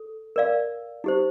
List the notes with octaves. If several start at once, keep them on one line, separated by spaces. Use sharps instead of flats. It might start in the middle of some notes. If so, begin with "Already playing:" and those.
Already playing: A4
A#4 D5 F5
D#4 G4 C5